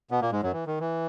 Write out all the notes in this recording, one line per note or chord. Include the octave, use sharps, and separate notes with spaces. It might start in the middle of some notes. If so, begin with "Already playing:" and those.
B2 B3
A#2 A#3
G#2 G#3
F#2 F#3
E3
D#3
E3